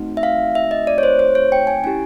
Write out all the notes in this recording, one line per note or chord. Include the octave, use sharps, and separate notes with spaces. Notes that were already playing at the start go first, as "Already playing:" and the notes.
Already playing: A3 C4 D#4 F#4
E5
F5
E5
D#5
D5
C#5
C5
C5
C#5
G5
G#5
C#4 E4 G4 G#5